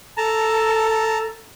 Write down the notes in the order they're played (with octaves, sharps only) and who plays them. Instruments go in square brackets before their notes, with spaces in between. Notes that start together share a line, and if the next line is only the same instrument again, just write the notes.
[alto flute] A4 [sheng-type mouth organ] A5 A#5